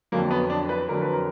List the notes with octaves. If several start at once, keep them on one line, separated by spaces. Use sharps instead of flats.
F2 D3 F#3 A#3
B3
D4
B4
F2 D3 F#3 A#4
B4
A#4